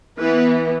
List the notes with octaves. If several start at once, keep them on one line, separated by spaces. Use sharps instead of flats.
E3 B3 B4